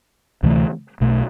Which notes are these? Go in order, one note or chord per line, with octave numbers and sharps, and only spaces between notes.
D2 C3 E3 A3
B1 B2 A3